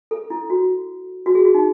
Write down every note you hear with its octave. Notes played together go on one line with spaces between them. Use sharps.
A4
E4
F#4
F#4
G#4
F#4
D#4